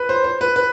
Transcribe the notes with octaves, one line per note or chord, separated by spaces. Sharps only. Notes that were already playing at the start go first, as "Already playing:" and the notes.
Already playing: B4
C5
C5
B4
B4